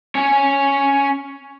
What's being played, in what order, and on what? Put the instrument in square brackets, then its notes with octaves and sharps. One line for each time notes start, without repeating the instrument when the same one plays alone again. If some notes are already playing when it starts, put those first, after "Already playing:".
[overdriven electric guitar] C#4 C#5